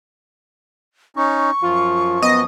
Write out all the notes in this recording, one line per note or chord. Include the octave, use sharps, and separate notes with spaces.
C#4 D#4 C#6
F#2 F3 F4
B3 D#5